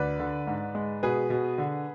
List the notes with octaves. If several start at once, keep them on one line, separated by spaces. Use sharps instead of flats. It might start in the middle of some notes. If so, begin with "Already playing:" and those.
Already playing: D2 B4 D5
D3
G#2
G#3
B2 G#4 B4
B2
D3